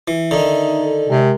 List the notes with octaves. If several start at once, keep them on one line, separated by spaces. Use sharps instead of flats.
E3
D3 D#3 D#4 E5 A#5
A4
C3 G#3 A#4